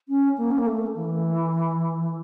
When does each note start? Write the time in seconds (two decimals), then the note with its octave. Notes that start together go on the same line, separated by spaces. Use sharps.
0.09 C#4
0.38 A#3
0.51 C#4
0.58 A#3
0.67 A3
0.96 E3